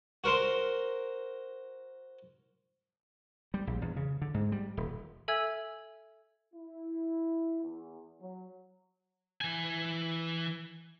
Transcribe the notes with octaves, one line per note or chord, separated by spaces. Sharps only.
F#4 A#4 C5 C6
G3
A#1
E2
C#3
D3
G#2
G3
D#1
A4 E5 G#5 E6 F6 G#6
E4
E2
F#3
E3 G#5